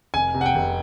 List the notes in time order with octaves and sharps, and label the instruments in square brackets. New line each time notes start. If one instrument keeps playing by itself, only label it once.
[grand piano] F1 G#5
C3
F#5
G5
F1